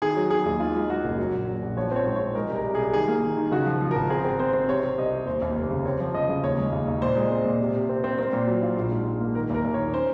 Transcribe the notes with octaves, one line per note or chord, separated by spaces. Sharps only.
D#3 G#4
F#3
D#3 G#4
D#2
D#3 F4
G#3
G#3 F#4
F#1
F#3
A#1
F#3
A#1
F3 C#5
C4 C#5
G#2
G#2 C#5
G#3 A#4
C2
A#4
C2
C2 G#4
D#3 G#4
A#3
D#3
D#3
C#3 F#4
F3
F3
G#1 A#4
C4 G#4
C4
C4 C5
C4
C3 C#5
C3
C2 D#5
C3
D#2 C5
D#2
F1
C#3
C4 C#5
F3
C#3 D#5
C#3
D#2 C#5
G#3
D#2
D#2
A#2 C5
G#3
C4
A#2
C3
C3
C4
C4
C4 A#4
A#2
F#3
F4
A#1
G#2
A#1
A#3
D#3 A#4
D#2 A#4
D#2
D#3 C#5
C#4 C5